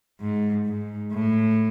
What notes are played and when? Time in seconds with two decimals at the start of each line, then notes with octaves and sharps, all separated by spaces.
0.20 G#2
0.66 G#2
1.12 A2